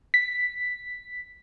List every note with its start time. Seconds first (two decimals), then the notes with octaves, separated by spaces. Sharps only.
0.14 B6